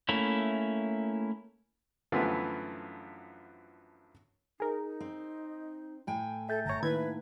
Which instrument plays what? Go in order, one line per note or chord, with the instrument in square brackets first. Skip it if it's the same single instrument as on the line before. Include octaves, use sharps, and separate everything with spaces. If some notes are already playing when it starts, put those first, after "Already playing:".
[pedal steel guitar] A3 A#3 C#4 E4
[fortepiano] F#2 D3 E3 F3 A3 B3
[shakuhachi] D#4 [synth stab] G#4 A#4
[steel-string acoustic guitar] C4
A2 G5 G#5
[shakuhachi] A4 [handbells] E5 G6 A6
[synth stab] G1 C#5 [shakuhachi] A#5
[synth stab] D#3 E4 G#6 [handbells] A#3 D#4 [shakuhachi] B4